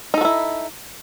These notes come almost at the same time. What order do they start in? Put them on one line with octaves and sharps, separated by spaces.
D#4 A4 F#4 E4